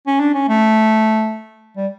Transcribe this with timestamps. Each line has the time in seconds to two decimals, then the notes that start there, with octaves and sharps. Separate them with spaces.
0.07 C#4
0.20 D4
0.34 C#4
0.48 A3
1.77 G3